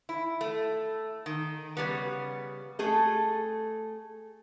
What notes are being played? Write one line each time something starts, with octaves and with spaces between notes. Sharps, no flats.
E4
A3
D#3
C#3 G3 B3
A3 G#4 A4